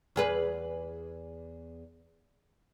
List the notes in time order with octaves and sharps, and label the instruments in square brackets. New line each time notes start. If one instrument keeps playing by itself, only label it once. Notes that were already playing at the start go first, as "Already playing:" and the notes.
[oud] E2 G#4 B4